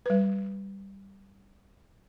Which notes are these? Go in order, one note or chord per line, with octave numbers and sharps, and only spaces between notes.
G3 B4